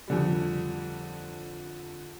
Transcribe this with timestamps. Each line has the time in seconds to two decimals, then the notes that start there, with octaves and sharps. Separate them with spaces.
0.08 F2 D3 G3